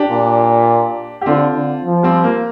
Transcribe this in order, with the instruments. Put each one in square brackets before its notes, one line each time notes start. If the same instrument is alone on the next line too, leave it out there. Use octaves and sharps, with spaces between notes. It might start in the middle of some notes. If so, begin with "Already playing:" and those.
Already playing: [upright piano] D4 G4
[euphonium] A#2
[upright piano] G4
[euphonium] D3 [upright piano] C4 F4
[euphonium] D3
F3
[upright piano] G3 C4
A#3